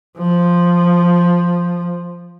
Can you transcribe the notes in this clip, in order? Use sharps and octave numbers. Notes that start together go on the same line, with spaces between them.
F3